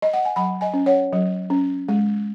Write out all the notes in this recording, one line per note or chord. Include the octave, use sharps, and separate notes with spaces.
D#5
F#5
G#5
F#3 F#5 B5
D#5 G#5
C#4
C#5 F#5
F#3
C#4
G#3